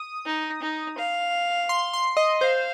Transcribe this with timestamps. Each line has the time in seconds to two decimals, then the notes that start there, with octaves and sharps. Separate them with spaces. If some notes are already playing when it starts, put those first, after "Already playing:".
Already playing: D#6
0.25 D#4
0.62 D#4
0.98 F5
1.69 C6
1.93 C6
2.17 D#5
2.41 C5 F5